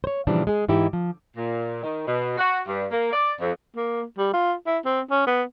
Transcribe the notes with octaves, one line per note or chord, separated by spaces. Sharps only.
C5 C#5
A#2 C#3 E3 F3 G3 D4
G#3 G#4
G#2 E3 D#4 E4 G4
F3
A#2
D#3
B2
F#4
G2
A#3
D5
F2
A#3
G3
F4
E4
C4
C#4
B3